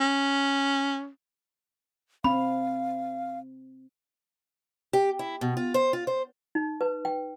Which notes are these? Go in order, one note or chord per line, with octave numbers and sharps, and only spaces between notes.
C#4
C4 F5 B5
G4
E4
B2
F4
C5
F4
C5
D#4
B4
G5